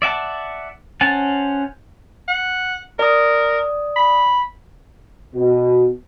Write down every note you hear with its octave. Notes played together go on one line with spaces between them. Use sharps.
D5 E5 F#5 A5
C#4 C5 F#5 A5
F#5
A#4 D5 D#6
B5
B2